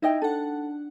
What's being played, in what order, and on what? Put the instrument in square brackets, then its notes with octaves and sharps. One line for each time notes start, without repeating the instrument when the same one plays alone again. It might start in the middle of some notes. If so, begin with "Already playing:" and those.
[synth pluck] D#4 [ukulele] E4 D#5 G5
[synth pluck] D4 F#5 [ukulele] A4